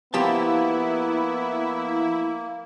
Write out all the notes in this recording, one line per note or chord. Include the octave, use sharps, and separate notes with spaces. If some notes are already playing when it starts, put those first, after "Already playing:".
F3 A#3 B3 E4 G4 A5